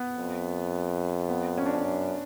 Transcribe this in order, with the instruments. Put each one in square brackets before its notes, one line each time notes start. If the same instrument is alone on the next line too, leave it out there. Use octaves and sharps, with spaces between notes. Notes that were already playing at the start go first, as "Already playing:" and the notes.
Already playing: [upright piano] B3
[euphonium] F2
[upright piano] B3
C#4
D4
C#4
[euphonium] F#2